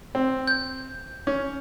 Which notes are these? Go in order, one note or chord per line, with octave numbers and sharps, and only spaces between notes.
C4
G6
C#4